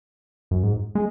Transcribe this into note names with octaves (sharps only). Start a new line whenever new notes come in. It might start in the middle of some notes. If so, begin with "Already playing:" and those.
F#2
G#2
G#3